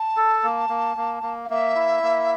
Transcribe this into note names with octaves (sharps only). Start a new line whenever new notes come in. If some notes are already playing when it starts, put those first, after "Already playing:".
Already playing: A5
A4
A#3
A#3
A#3
A#3
F5
A#3 E5
E4
A#3